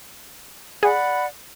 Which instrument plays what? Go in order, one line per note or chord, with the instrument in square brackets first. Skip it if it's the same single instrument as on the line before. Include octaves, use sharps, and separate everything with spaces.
[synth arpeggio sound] G#4 [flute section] D5 F#5 B5